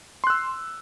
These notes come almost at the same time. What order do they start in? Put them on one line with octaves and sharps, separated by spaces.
C6 F#6 E6